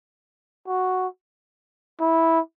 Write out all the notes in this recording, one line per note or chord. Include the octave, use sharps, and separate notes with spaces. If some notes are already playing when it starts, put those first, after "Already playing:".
F#4
E4